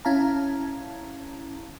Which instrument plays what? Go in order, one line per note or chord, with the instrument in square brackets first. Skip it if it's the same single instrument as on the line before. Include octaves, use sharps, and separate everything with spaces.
[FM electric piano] C#4 E4 F5 A5 A#5